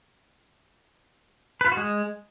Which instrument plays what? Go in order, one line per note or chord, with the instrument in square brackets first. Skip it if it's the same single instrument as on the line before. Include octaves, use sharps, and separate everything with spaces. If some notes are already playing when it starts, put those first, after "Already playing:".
[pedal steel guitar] B4
F4
F#4
G#3